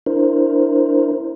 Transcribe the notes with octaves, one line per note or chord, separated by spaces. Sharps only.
D4 E4 A#4 C5